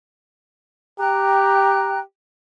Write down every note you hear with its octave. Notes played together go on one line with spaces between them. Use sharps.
G4 G5 A#5 F#6